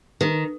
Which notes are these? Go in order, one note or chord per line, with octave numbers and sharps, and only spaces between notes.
D#3